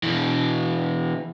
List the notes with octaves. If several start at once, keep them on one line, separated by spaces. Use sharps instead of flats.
B2 E3